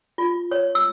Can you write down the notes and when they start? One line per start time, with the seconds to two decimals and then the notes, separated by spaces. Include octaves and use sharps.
0.18 F4
0.51 C#5
0.75 E6